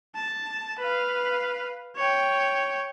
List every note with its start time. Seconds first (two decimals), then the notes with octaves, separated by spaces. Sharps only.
0.15 A5
0.79 B4 F5
1.96 C#5 G5